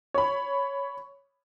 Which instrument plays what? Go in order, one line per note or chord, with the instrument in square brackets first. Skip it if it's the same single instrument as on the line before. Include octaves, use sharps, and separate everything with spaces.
[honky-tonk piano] C#5 B5